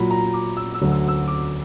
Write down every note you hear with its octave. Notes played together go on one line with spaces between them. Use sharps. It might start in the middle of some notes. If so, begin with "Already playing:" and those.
Already playing: A#2 F#3 B5
A#5
D6
E6
E6
D2 D3 F#3
E6
E6
D6